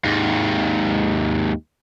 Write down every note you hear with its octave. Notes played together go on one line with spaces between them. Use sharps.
D#2 G#2